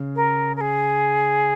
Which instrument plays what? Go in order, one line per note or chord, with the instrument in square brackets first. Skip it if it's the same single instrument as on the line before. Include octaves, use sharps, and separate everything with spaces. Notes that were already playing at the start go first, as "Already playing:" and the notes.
Already playing: [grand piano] C#3
[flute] A#4
A#4
G#4